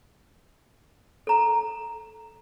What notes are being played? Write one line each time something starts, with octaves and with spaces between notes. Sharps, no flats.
A4 A#5